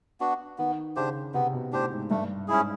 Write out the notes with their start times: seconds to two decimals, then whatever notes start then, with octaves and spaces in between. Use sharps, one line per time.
0.20 B3 D4 F#4
0.58 D#3 B3
0.96 C#3 D4 G4 C5
1.34 C3 B3
1.53 B2
1.72 A2 D4 G4 C5
1.91 G#2
2.10 G2 A3
2.48 G#2 C#4 E4 G#4